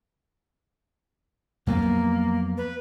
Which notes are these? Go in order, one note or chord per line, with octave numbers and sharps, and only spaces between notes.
F2 F#3 A#3 B3
B4